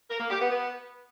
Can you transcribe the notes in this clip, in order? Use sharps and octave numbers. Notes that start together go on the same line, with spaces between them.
A#4
A#3
G4
B3
B3